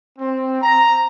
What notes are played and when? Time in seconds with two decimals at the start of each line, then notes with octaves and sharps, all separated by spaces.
0.18 C4
0.62 A#5